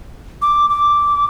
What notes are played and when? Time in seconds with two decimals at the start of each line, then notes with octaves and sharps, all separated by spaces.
0.42 D6
0.70 D6